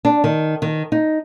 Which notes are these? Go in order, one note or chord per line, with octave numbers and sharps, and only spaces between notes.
D4
D#3
D#3
D#4